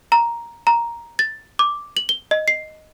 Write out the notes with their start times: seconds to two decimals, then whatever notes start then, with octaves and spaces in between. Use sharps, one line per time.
0.12 A#5
0.67 A#5
1.19 A6
1.59 D6
1.97 F#7
2.09 G7
2.31 D#5
2.48 C7